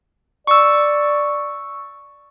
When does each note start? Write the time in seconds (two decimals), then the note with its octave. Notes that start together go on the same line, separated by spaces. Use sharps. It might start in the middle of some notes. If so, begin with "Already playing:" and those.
0.47 D5 C#6 E6